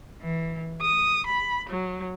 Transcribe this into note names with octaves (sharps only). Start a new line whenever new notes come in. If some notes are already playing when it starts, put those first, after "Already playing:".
E3
D#6
B5
F#3